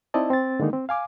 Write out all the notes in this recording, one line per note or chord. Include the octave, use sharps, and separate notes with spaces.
C4 D#4 E4 D5 D#5 A5
C4 A6
D3 D#3 G#3 A#3 D#4
C4
F5 G#5 D6